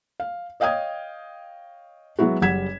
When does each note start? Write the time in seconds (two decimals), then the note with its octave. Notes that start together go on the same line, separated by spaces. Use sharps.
0.20 F5
0.60 C#5 D#5 F5 G5 D#6 G#6
2.19 F#3 G#3 B3 E4 F#4
2.41 F#1 G3 F#5 G#6 B6 E7